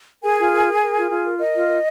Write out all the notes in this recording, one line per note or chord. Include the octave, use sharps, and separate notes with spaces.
G#4 A#4 G#5
F4
A#4
A#4
A#4
F4
F4
A#4
A#4 D#5
F4
A#4